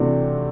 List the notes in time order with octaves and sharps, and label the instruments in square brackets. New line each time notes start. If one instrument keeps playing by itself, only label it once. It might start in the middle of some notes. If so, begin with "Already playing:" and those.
Already playing: [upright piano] C3 E3 A3 D4 F#4